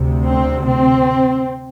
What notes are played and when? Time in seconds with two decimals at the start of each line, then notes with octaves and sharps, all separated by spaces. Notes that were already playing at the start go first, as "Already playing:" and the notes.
Already playing: D2 C3
0.27 C4
0.67 C4